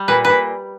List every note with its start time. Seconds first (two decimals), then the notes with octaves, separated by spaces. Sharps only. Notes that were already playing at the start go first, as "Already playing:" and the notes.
Already playing: G3
0.08 A#2 B4
0.25 A#2 B4